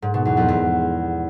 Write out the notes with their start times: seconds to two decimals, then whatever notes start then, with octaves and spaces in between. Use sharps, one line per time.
0.02 G#2
0.14 B2
0.25 E2
0.37 F2
0.48 E2